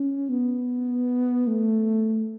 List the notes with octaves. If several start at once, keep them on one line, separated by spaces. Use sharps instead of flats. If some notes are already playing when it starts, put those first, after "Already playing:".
Already playing: C#4
B3
A3